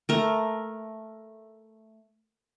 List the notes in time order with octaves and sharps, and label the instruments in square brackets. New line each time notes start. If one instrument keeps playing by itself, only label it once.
[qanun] A3 A#4